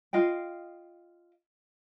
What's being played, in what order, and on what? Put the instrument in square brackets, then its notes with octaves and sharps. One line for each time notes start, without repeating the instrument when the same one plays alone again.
[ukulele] F4 D#5 F5 G5